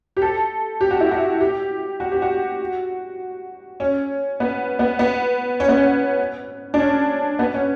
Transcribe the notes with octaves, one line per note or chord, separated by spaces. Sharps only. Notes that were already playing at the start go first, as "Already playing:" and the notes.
G4
A4
G4
F#4
E4
F#4
G4
F#4
G4
F#4
C#4
B3
B3
B3
C#4
B3
C#4
D4
C#4
B3
C#4